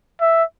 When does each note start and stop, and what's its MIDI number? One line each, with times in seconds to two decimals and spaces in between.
0.21 0.44 76